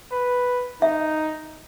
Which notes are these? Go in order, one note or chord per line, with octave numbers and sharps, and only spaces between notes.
B4
D#4 E5